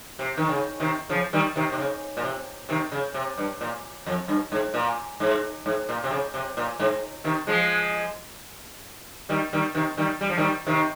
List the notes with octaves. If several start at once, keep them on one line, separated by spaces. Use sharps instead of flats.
C3
D#3
C#3
C3 D#3
C#3 F3
D#3 G3
C3 D#3
C3
C#3
A#2
C3
C3 D#3
C#3
C3
G2
A#2
F2
G2
G#2
A#2
G#2
G#2
A#2
C3
C#3
C3
A#2
G#2
C3 D#3
F3 G#3
D#3 G3
D#3 G3
C3 D#3
D#3 G3
G3
F3
D#3 G3
C3 D#3